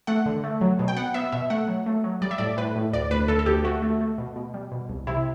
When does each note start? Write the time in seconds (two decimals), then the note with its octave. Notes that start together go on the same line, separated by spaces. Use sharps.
0.07 A3 F#5
0.26 D3
0.44 A3
0.61 F#3
0.79 B2
0.88 G5
0.97 B3 F#5
1.14 B3 E5
1.32 B2 E5
1.50 A3 F#5
1.68 F#3
1.86 A3
2.04 F#3
2.22 G3 D5
2.31 E5
2.38 A2 D5
2.57 A2 B4
2.76 A2
2.93 D2 D5
3.11 D2 B4
3.28 D2 A4
3.39 A4
3.46 D2 G4
3.64 A3 F#4
3.82 A3
4.01 A3
4.18 B2
4.36 B2
4.54 G3
4.72 B2
4.89 C2
5.07 C3 E4